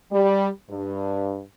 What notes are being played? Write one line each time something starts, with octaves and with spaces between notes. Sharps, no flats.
G3
G2